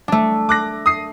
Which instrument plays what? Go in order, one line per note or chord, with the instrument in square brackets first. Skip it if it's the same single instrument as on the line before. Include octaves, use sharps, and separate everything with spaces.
[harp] A3 D4
[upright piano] D6 F#6 A#6
D#6 C7